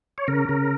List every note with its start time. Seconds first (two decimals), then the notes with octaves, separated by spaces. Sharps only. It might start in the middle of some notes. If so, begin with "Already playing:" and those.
0.18 C#5
0.28 C#3 A#4
0.49 C#3